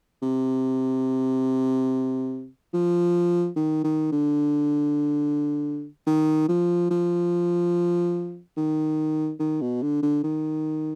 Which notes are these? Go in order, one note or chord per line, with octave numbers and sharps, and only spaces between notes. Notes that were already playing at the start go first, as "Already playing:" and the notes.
C3
F3
D#3
D#3
D3
D#3
F3
F3
D#3
D#3
B2
D3
D3
D#3